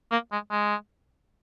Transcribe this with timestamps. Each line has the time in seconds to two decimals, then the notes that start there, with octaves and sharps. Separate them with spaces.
0.11 A#3
0.32 G#3
0.51 G#3